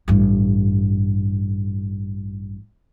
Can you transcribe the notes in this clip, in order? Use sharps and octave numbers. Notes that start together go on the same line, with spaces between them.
A1 G2